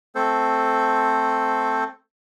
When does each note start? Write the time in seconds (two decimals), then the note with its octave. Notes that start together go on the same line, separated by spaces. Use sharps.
0.15 A3 C4 A4 C5